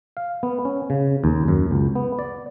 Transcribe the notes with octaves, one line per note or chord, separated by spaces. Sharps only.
F5
B3
C#4
C#3
D#2
F#2
C#2
B3
D5